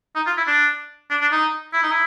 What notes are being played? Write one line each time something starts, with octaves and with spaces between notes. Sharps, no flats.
D#4
F4
E4
D4
D4
D4
D#4
E4
D#4
E4